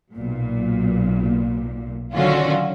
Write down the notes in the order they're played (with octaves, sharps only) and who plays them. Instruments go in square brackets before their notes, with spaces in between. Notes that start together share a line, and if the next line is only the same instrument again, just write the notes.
[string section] B1 A#2
D3 D#3 F#3 C#4 F4 F#4